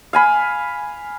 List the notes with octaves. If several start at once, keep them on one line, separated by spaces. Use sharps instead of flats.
F5 G#5 B5